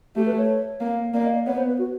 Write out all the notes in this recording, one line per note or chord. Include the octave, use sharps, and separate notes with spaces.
A3 G4
B4
C#5
A#3
A#3 D5
D#5
D5
B3 C#5
C5
B4
F#4